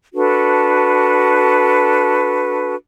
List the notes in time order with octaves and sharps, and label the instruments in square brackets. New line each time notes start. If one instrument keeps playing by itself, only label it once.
[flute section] D4 F#4 A4 B4